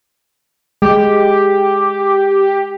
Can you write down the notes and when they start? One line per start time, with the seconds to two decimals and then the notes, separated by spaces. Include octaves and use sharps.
0.82 G#3 G4